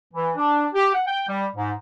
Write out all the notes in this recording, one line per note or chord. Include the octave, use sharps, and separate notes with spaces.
E3
D4
G4
F#5
G5
G3
G#2